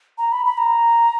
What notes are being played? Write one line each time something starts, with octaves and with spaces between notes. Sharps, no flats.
A#5
B5
B5
A#5